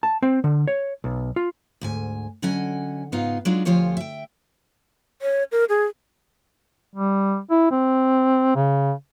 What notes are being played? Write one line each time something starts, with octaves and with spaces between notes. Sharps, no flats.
A5
C4
D3
C#5
B1
F4
D2 G#2 G#5
D3 F#3 C#4 D#5 F#5 G#5
G#2 C#3 B3 D#4 F4 F5
F#3 G#3 D4 D#4 F4
D2 F3 F4 G4 C#5 G#5
E5 G5
C#5
A#4
G#4
G3
E4
C4
C#3